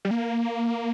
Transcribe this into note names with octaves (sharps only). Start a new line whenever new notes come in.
G3
A#3